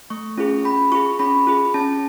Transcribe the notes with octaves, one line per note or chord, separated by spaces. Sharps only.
A3 C#6
C#4 F4 G#4
C#4 B5
F4 G#4 C#6
C#4 B5
F4 G#4
C#4 A5